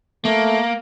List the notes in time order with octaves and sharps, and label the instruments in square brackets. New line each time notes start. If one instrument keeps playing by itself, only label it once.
[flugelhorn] A3 [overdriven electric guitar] A#3